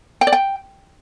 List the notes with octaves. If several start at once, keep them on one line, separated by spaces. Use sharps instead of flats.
G5
D5
G5